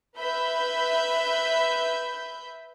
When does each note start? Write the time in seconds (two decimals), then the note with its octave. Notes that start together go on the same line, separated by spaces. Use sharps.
0.17 B4 E5 B5 G6